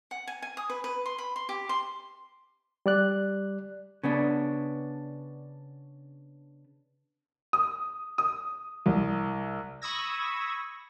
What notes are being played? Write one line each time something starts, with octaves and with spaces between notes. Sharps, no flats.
F#5
G#5
G#5
D#6
B4
B4
C6
B5
C6
G4
C6
G3 D5 F#6
C#3 B3 D4
D#6
D#6
C2
B5 C#6 D#6 E6 G#6 A#6